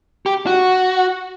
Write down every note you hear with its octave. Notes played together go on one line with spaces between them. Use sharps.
G4
F#4